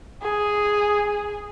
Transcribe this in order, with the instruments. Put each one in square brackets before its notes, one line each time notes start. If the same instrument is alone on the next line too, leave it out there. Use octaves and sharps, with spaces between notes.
[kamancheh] G#4